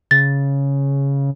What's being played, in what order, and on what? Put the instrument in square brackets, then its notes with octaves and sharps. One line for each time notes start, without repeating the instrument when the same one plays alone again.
[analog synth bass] C#3 [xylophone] A6